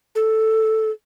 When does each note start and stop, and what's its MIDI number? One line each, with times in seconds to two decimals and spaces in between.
0.15 0.90 69